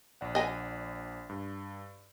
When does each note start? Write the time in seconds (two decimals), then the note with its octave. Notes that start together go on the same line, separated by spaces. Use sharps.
0.21 A#1 D5 F#5
0.35 D#5 G#5
1.29 G2